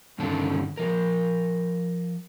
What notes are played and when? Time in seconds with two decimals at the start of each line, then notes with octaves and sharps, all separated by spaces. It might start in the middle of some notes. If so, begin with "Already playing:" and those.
0.18 G2 D3 D#3 C#4 A4 A5
0.77 F3 A#4